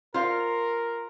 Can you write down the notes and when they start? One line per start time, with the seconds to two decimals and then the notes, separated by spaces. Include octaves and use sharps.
0.14 F4 A#4 C5 F5